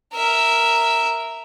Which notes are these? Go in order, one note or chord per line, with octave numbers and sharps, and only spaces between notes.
A#4 E5